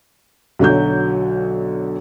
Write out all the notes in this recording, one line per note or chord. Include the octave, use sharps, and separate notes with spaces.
B1 D3 F#3 G6